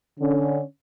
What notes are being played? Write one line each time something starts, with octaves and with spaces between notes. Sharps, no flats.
D3 C#4